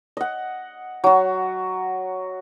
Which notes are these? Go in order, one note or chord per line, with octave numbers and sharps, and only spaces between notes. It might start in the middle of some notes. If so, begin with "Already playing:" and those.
D#5 F#5
F#3 F#4